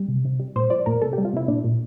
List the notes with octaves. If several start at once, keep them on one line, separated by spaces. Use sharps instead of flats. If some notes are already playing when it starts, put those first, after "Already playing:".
Already playing: G3
C3
C3
G3
A#2 C5
F3 D5
A#2 A#4
C3 A4
G4
G3
F4
C3 E4
A#2 D4
A#2